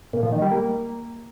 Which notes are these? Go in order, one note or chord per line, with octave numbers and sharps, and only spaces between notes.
A#2
F3
D#3
G3
A#3